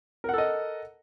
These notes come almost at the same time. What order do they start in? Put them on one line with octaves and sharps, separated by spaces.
A#4 F#5 A4 D#5